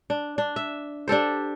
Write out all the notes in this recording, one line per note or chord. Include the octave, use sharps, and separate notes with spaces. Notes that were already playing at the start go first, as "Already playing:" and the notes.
D4
D4
E5
D4 G4 A4 C5